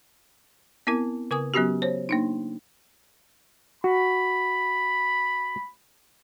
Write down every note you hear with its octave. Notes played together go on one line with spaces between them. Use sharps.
B3 C4 E4 A#4
C#3 A#4 G#5 D#6
F#3 B3 C#4 F#4 G4
C5 C#5
A#3 D4 D#4
F#4 B5